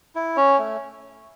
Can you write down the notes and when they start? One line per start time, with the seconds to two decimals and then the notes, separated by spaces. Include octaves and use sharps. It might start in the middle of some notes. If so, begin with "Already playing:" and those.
0.15 E4
0.37 C#4 C#5
0.58 A3